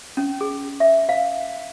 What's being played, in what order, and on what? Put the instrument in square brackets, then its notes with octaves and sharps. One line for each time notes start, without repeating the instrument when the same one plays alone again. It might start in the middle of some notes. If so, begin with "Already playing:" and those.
[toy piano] C#4
G#4
E5
F5